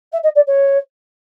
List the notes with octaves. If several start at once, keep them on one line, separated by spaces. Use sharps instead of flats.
E5
D#5
D5
C#5